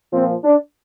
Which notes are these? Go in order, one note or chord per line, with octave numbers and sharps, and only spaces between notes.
A#2 F3 C4
D4